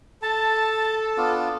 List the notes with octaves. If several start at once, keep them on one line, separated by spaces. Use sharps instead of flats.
A4 A5
B3 D4 F4